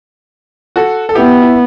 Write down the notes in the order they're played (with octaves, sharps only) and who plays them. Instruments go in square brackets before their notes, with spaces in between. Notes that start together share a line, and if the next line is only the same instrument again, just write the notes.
[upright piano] F#4 A4
A4
[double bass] B3 [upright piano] E4 G4
[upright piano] E4